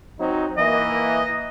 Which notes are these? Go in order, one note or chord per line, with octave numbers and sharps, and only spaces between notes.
F#3 C4 D#4
E3 A#3 D#5